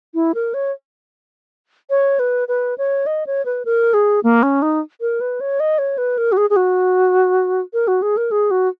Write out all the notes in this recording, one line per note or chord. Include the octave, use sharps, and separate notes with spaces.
E4
A#4
C#5
C#5
B4
B4
C#5
D#5
C#5
B4
A#4
G#4
A#3
C#4
D#4
A#4
B4
C#5
D#5
C#5
B4
A#4
F#4
G#4
G#4
F#4
A#4
F#4
G#4
A#4
G#4
F#4